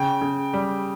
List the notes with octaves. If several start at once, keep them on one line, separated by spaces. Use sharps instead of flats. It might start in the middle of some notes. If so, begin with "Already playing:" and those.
Already playing: C#3 G5
C#3
G3